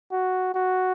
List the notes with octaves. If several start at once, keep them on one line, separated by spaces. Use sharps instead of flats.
F#4
F#4